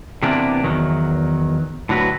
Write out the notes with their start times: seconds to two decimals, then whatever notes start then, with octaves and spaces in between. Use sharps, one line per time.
0.22 C3 E3 A#3 B3 D4
0.63 E2 D#3 F#3
1.89 A2 D3 F#3 F#4 B4